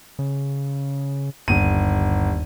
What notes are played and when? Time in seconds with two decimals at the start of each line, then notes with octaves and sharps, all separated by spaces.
0.19 C#3
1.48 G1 D#2 D#7